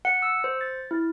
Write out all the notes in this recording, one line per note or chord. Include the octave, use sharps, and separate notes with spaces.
F#5
E6
C5
A6
E4